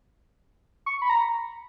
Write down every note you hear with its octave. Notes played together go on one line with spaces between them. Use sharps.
C#6
B5
A#5